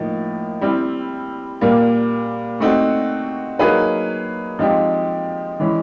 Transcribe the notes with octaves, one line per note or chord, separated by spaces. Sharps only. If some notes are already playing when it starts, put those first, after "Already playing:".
Already playing: A2 F3 A#3 D#4
G3 C4 E4
A#2 G3 A#3
A3 C4 D#4 F#4
F#3 A#3 D#4 G#4 B4
F3 G#3 C4 D#4 G4
E3 G#3 C#4 E4